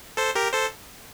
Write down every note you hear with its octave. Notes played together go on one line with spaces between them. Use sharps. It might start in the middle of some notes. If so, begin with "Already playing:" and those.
A4 C5
G4 A#4
A4 C5